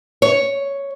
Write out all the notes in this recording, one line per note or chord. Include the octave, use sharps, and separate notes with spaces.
C#5